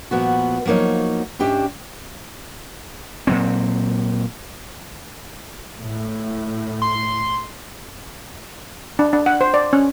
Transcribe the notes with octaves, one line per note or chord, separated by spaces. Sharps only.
A#2 F3 B3 F#4
F3 F#3 A#3 D#4 C#5
G#2 C#4 D4 G4 E5
A#2 F#3 C4
A2
C6
D4
D4
F#5
C5
D5
C#4